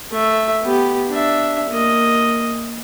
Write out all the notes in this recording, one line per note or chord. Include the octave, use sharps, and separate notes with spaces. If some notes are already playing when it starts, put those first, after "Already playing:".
A3 E5
B3 G4
D4 E5
A#3 D#5